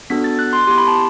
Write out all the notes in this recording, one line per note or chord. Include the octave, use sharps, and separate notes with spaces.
B3 D4 F#4 A4 B6
A6
F#6
C6
B3 E4 G4 C6
B5
A5